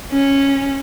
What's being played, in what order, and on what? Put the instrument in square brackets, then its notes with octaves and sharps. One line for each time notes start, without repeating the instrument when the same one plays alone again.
[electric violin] C#4